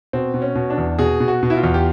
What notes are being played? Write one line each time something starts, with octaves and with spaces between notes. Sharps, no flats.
B2 C4
B2
C#4
B2
D4
E2
B2 G#4
B2
F#4
B2
E4
F4
E2
G4